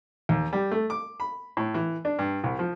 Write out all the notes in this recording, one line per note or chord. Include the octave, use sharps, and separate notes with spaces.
D#2
G3
A3
D6
B5
A2
E3
D4
G2
C2
F3